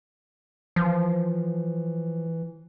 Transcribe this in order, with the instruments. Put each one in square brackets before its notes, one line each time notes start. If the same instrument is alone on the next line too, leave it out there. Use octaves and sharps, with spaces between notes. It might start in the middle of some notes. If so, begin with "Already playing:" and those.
[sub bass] E3 [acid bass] F3